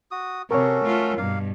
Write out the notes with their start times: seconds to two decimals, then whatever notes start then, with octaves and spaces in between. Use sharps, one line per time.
0.11 F#4 D#6
0.51 C3 C#4 F#4 A4 A#4 C#5
0.84 A3 F4
1.18 G2 B2 A#3 F5